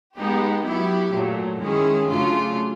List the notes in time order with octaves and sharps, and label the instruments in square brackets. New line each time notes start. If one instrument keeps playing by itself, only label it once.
[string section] G#3 B3 D#4 G4
F#3 B3 E4 G4
A#2 F#3 A3
D#3 G#3 C#4 E4 G#4
C#3 F#3 A3 D4 F4